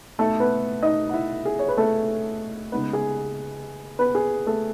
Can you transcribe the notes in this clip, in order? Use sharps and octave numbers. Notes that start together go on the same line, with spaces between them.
B2 A3 D#4 A4
B3 B4
D#4 D#5
F#5
E4 E5
G#4
C#5
B4
A3 A4
C#3 G#3 B3 D#4 B4
G#4 G#5
B3 B4
G#4
A3 A4